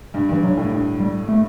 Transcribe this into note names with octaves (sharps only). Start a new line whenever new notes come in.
G2
G2 E3
G2 F#3
A2
G2
G3
A3